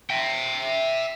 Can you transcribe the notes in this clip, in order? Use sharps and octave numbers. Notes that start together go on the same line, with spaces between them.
E5 G5